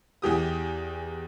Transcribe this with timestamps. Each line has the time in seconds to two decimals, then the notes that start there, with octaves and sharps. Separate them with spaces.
0.22 E2 E3 G4 D#6